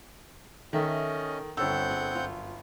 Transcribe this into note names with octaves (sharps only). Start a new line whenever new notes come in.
D#3 C#4 A4 D#5 E5 F#5
G1 C4 A4 C#5 F#5 G5 E6 G6
G#4
F#2 F4